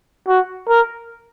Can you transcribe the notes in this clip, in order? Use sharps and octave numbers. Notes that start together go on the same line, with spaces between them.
F#4
A#4